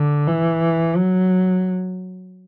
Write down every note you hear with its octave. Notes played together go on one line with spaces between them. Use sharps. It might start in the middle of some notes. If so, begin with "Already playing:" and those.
Already playing: D3
E3
F#3